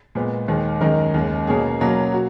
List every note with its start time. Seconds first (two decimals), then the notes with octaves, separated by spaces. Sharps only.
0.15 A#2 G#3 B3
0.48 D#2 D#3 G#3
0.81 F#2 D#3 G#3 D#4 A#4
1.14 D#2 C#3 G#3
1.47 B2 A#3 C#4 G#4
1.80 B2 F#3 A#3 C#4
2.13 F#4